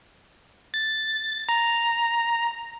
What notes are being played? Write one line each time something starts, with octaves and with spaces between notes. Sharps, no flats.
A6
A#5